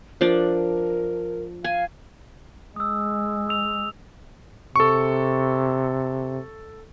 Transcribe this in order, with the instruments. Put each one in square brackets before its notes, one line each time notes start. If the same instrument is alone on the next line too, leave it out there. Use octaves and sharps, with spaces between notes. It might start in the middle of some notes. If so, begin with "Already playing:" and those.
[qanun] F3 D4 D5 [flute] A#4
[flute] F5 [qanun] G#5
[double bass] G#3 [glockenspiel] D#6 E6
[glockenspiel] E6 F7
[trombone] C3 [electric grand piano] A4 C#6